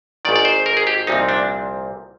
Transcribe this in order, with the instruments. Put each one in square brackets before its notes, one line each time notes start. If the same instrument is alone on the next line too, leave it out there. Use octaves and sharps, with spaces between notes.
[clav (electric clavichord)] G#1 G#2 D#3 D5
D5
C5
A#4
G#4
G4
C2 A#2 F3 C4 D#4
D4